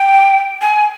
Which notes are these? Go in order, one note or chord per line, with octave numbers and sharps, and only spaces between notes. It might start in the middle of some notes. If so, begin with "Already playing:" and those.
Already playing: G5
G#5